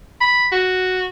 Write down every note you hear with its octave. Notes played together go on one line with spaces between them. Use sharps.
B5
F#4